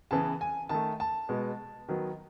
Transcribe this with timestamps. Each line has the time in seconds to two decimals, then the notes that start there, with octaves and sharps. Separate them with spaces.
0.11 C#3 E3 B3 A5
0.41 G#5
0.69 D#3 A3 A5
1.00 A5
1.29 B2 G#3 B3
1.89 D#3 F#3 B3